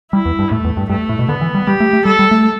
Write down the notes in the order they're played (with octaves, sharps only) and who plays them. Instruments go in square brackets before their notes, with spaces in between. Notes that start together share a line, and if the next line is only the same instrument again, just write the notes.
[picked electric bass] G3 [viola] E4
[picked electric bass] E2
G2
[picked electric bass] A2 [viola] A3
[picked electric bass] E2
G2
[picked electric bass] G2 [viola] A3
[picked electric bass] A2
B2
[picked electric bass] D3 [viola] B3
[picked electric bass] E3
G3
[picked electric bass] G3 [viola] G4
[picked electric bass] A3
A3
[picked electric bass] G3 [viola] A4
[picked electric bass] G3
A3